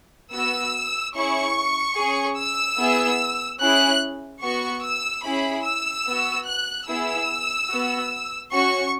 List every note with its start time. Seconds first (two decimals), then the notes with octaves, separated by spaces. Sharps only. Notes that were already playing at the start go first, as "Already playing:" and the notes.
0.33 B3 F#4 E6
1.15 C#4 E4 G#4 C#6
1.97 C#4 G#4
2.38 E6
2.79 B3 E4 G#4
3.60 C#4 E4 G#4 F#6
4.42 B3 F#4 C#6
4.83 E6
5.24 C#4 E4 G#4 B5
5.65 E6
6.07 B3 F#4
6.47 F#6
6.88 B3 E4 G#4 E6
7.70 B3 F#4
8.52 C#4 F#4 C#6